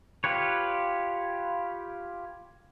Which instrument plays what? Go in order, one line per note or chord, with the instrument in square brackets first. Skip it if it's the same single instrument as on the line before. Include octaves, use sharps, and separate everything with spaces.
[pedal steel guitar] F4 G4 B4 C#5